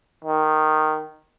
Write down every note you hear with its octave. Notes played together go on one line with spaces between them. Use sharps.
D#3